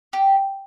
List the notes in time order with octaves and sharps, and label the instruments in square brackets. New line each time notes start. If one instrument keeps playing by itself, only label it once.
[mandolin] G4